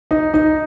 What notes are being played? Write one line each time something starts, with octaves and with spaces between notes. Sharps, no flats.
D#4
D#4